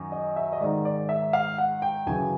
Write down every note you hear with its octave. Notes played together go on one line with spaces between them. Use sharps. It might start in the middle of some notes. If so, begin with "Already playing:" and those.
Already playing: F#2 D#3
D#5
E5
D#5
G#2 D#3 D5
D5
E5
F5
F#5
G5
F#2 C#3 E3 G#5